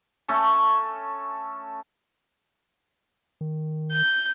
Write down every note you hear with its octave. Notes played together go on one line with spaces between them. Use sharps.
A3 C#4 A4
D#3
G6